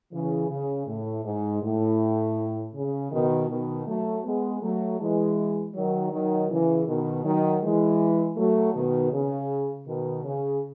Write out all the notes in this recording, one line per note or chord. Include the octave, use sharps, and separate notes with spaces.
C#3 E3
C#3
A2
G#2
A2
C#3
B2 D#3
B2 D#3
F#3 A3
G#3 B3
F#3 A3
E3 G#3
D#3 F#3
D#3 F#3
C#3 E3
B2 D#3
D#3 F#3
E3 G#3
F#3 A3
B2 D#3
C#3
B2 D#3
C#3